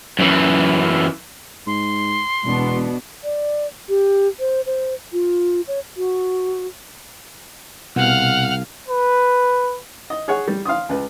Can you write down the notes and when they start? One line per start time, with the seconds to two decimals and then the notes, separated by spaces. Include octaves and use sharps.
0.19 F#2 E3
1.67 G#2 C6
2.45 E1 B2 B3 D4
3.24 D5
3.89 G4
4.40 C5
4.66 C5
5.13 F4
5.68 C#5
5.97 F#4
7.96 C2 B2 F5 F#5 F6
8.88 B4
10.10 D#5
10.28 G#4 C#5 F#5
10.48 G3
10.65 F5 C6 D#6
10.89 C#2 B4